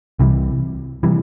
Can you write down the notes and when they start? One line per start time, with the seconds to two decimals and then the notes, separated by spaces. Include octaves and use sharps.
0.19 C2 C3 E3 G3
1.03 C3 E3 G3